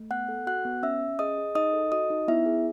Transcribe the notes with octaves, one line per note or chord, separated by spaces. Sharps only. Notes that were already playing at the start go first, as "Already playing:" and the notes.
Already playing: A3
B3 F#5 F#6
A4
F#4 F#5 F#6
B3
C#4 E5 E6
C#4
G#4 D#5 D#6
G#4
D#4 D#5 D#6
A4
F#4 D#5 D#6
D#4
B3 E4 E5
G#4